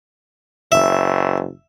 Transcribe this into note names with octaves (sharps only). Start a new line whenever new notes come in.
F#1 E5